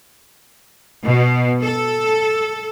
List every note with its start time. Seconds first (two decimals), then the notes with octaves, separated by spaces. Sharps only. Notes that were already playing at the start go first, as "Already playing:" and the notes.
1.04 B2
1.63 A4